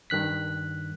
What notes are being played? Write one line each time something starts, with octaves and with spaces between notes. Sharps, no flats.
G2 D#3 F#6 B6